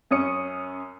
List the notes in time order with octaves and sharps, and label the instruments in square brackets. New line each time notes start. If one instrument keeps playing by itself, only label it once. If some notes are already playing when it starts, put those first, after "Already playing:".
[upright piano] F#2 C#4 D#6 C#7